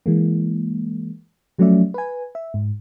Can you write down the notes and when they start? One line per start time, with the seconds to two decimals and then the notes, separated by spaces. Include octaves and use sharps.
0.06 E3 G#3 A#3
1.58 F3 F#3 A3 C#4 D5 E5
1.94 B4 G#5
2.35 E5
2.54 G#2